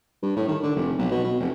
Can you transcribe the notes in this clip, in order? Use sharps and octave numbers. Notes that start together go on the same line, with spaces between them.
G2
A2
D#3
D3
F1
B1
B2
B2
F1